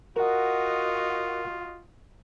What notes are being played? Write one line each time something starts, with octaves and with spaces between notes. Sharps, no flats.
F4 F#4 A#4 D#5 F#5